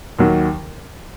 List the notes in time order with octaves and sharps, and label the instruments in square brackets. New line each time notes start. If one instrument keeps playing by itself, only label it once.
[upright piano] D#2 D#3 F#3